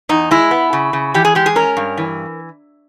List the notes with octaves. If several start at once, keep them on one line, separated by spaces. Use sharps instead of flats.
E2 D#4
G#3 E4
B3
C#3
C#3
E3 G4
G#4
G#3 G4
G#4
C#4 A#4
G2
E3